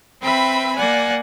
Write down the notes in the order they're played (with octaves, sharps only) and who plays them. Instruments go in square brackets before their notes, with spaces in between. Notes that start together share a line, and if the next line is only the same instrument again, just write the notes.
[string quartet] C4 B4 E5 G5 B5
A#3 D5 F#5 G#5